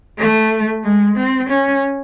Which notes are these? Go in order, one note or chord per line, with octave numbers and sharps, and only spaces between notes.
A3
G#3
C4
C#4